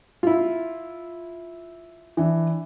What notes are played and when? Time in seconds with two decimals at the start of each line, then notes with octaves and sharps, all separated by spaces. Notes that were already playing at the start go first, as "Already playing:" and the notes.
0.23 E4 F4
2.17 E3 D4